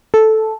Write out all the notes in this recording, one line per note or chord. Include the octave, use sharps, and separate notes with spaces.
A4